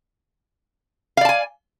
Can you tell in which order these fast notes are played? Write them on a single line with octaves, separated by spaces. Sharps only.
F5 D5 A5 G#5